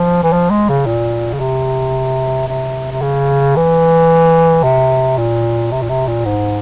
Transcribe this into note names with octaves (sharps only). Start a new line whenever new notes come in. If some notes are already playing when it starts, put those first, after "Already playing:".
Already playing: F3
E3
F3
G#3
C#3
A#2
C#3
C3
C3
C3
C#3
E3
C3
A#2
C3
A#2
C3
A#2
G#2